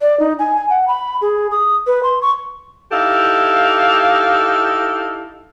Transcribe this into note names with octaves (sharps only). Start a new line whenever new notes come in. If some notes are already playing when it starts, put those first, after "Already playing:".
D5
D#4
G#5
G#5
F#5
B5
G#4
D#6
B4
C6
C#6
D#4 E4 G4 A4 F5